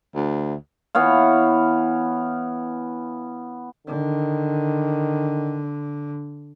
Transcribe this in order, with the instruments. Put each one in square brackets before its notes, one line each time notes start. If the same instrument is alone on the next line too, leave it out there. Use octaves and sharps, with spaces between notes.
[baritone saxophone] D2
[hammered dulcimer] E3 B3 C#5 F5
[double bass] D3 [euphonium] D#3